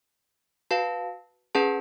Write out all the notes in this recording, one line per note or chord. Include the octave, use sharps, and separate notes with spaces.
F#4 B4 F5 A5
C#4 G#4 B4 F#5 A5